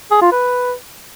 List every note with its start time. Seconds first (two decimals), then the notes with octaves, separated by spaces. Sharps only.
0.11 G#4
0.22 F4
0.32 B4